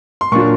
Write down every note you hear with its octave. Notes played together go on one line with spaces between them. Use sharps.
C6
A#2 F#3 A#3 D4 F4 C#6